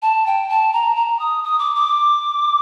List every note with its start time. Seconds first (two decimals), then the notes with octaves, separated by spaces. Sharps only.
0.02 A5
0.26 G5
0.49 A5
0.73 A#5
0.96 A#5
1.19 D#6
1.44 D#6
1.59 D6
1.76 D6